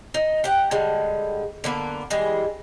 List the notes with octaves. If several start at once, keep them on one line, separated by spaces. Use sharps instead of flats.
D#4
G4 F#5
D3 G3 G#3
D3 A#3 B3
E3 G3 G#3 G#4